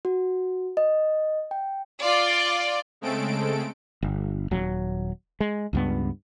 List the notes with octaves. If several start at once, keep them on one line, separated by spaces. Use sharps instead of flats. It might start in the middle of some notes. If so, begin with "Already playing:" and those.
F#4
D#5
G5
F4 D5
C#3 G#3 A3 C4 A4 D7
G1
D#1 F#3
G#3
C#2 G2 B3